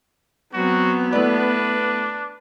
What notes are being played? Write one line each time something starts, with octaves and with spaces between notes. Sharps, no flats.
F#3 B3 C4 F#4
A3 D4 E4 B4 D5